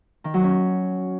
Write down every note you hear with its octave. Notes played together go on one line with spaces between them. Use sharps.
D#3
F#3
C#4